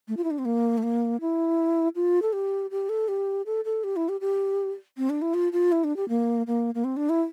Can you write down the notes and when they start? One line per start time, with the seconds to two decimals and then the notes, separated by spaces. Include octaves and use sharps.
0.08 A3
0.17 F4
0.24 E4
0.31 D4
0.39 C4
0.45 A#3
0.78 A3
0.83 A#3
1.21 E4
1.96 F4
2.22 A4
2.33 G4
2.71 G4
2.89 A4
3.08 G4
3.46 A4
3.65 A4
3.84 G4
3.96 E4
4.09 G4
4.21 G4
4.97 C4
5.10 D4
5.22 E4
5.34 F4
5.53 F4
5.72 E4
5.84 D4
5.97 G4
6.09 A#3
6.47 A#3
6.75 A#3
6.84 C4
6.97 D4
7.09 E4